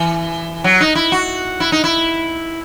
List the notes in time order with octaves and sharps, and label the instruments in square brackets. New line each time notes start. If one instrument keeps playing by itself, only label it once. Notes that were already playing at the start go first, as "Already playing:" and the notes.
Already playing: [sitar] E3
F#3
D#4
E4
F#4
E4
D#4
E4